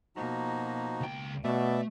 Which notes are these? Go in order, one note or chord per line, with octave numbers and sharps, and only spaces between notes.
B2 F3 A#3 D#4 F#4
C#2 G5
B2 A3 B3 D5 E5